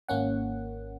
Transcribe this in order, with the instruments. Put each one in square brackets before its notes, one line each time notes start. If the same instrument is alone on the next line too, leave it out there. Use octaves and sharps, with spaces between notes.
[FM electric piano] G#1 A#3 C#4 F#5